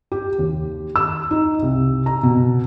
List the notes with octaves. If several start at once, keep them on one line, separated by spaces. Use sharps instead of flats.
G4
D#2
E6
D#4
C2
A#5
B2